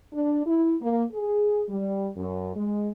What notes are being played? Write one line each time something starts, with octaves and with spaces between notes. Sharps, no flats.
D4
E4
A#3
G#4
G3
F#2
G#3